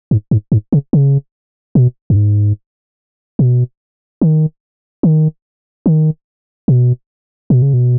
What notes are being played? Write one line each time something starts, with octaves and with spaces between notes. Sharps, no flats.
G#2
G#2
G#2
C#3
C#3
B2
F#2
G#2
B2
D#3
D#3
D#3
B2
B2
C#3
B2